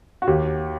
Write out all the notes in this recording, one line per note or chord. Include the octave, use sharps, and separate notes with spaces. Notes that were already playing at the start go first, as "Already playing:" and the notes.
F#4
D#2 G4